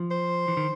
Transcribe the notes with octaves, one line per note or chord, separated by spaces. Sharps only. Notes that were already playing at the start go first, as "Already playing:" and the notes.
Already playing: F3
C5
E3
D#3